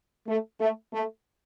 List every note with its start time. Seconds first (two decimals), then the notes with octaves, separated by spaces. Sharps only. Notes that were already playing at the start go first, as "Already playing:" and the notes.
0.26 A3
0.59 A3
0.92 A3